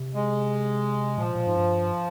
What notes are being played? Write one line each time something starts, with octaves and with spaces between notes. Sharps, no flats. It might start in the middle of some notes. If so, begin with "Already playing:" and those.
Already playing: C3
G#3
A#2 F3
A#2
G#2
G2